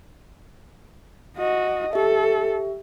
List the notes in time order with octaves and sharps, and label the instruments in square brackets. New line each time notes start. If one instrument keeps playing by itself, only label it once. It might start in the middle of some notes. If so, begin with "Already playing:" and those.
[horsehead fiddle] F#4 D#5
[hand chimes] G4 E5 [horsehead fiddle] A4